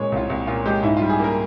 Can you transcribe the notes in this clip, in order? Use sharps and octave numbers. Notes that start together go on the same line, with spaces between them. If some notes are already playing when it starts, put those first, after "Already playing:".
Already playing: A#2 G#3 C#5
C2 F4
C2
A#2 F4
G#3 G4
G#2 E4
F4
G3
G#4
A#3 A#4